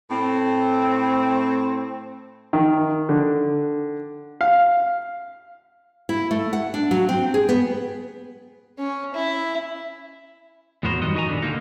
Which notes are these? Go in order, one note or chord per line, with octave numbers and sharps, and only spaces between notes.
A2 C4
D#3
D3
F5
E4
A3
F#5
D4
F#3
C4
G#4
B3
C#4
E4
E2 A2 B3 F#4 A#4 C5
F#2 D#3 G3 F#4 D#5
D#4 F#4 D#5 G5 G#5 A#5
D#2 A#2 B3 D4 A4
D3 D#3 A#3 D#4